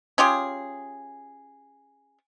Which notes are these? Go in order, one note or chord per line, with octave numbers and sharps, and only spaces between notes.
C#4 F4 G4 G#4